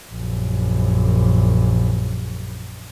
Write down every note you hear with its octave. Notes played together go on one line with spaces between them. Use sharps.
A#1 F#2